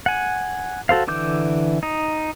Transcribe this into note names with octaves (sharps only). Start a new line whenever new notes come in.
F#5 G#5
F#4 A4 C5 F5
D3 E3 D6 G6
D#4